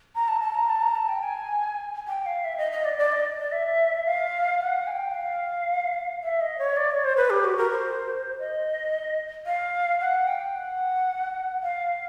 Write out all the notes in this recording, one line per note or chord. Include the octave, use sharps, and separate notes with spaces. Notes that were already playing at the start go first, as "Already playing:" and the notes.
A#5
A5
A5
A#5
A5
A#5
A5
G5
G#5
G5
F5
E5
D#5
D#5
D5
D5
D#5
D5
E5
F5
F#5
G#5
G5
F5
E5
D#5
C#5
D5
C#5
C5
B4
G4
F#4
A#4
C5
D#5
F5
F#5
G5
F#5
F5